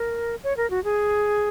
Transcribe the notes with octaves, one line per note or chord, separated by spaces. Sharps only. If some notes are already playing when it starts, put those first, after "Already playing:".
Already playing: A#4
C#5
A#4
F#4
G#4